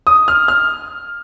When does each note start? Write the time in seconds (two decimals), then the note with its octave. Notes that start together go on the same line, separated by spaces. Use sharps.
0.07 D#6
0.28 F6
0.48 F6